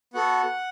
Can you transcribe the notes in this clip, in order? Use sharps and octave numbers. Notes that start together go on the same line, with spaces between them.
B3 F#4 A4 F#5